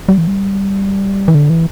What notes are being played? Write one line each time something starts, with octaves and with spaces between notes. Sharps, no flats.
G3
E3
G3
E3
D3
E3